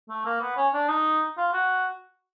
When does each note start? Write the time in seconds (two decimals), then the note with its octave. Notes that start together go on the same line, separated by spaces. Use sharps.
0.09 A3
0.25 A#3
0.41 B3
0.57 C#4
0.74 D4
0.88 D#4
1.37 F4
1.53 F#4